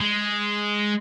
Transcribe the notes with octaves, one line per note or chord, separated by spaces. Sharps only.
G#3